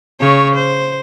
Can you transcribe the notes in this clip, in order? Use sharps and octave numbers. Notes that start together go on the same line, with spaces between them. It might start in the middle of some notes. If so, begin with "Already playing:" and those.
C#3 C#5
C5